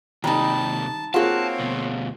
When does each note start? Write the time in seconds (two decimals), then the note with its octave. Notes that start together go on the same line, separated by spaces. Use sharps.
0.24 D#2 C3 G3 D#4 A5 A#5
1.14 A#3 C4 F4 F#4 G#4 C#5 A5
1.60 D2 B2